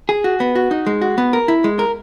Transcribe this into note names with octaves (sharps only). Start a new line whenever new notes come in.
G#4
F#4
B3
F#4
D#4
G#3
F#4
B3
A#4
E4
G#3
A#4